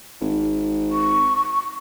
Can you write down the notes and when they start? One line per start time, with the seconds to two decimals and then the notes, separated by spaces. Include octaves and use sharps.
0.21 G#1
0.92 C#6